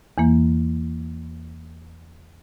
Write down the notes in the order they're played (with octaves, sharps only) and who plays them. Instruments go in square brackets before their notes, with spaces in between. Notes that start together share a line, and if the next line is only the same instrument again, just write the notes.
[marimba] E2 E3 A#3